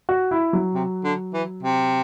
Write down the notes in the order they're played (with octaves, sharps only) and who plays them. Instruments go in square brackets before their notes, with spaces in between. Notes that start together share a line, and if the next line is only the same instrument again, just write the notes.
[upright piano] F#4
E4
F#3
[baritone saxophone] C3
D3
E3
C3